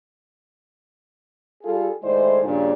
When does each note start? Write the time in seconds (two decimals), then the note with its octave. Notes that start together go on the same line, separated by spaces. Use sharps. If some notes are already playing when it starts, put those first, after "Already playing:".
1.63 G3 F4 G#4 A4
2.03 A2 D#3 G#3 E4 C5 D5
2.44 G2 A#2 C#3